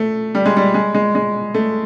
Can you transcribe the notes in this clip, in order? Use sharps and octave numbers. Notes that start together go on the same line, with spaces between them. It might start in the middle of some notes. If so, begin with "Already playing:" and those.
Already playing: A3
G3
G#3
G3
G#3
G#3
G#3
A3